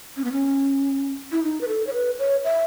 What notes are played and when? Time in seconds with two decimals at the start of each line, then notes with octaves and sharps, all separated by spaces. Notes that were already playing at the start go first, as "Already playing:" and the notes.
0.17 C#4
0.24 B3
0.32 C#4
1.32 E4
1.43 D#4
1.61 B4
1.68 A4
1.87 C#5
1.93 B4
2.19 C#5
2.44 E5